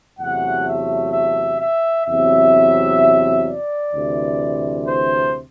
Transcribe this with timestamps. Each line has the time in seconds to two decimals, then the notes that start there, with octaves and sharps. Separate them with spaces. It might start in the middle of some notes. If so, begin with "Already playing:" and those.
0.17 E2 C3 F#3 A3 F#5
0.65 E5
1.11 E5
1.58 E5
2.05 E2 C3 F#3 C4 E5
3.45 D5
3.92 D2 C3 E3
4.86 C5